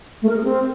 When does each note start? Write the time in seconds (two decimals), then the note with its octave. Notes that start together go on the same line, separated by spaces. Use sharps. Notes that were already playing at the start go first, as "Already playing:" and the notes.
0.22 A3
0.29 A#4
0.37 G#4
0.44 C4